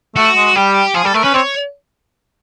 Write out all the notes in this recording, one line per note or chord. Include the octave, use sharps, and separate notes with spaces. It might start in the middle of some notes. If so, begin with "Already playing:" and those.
A3 F#4
G#3
G3 G4
F3 G#4
G3 A4
A3 A#4
C#4 B4
C4 C#5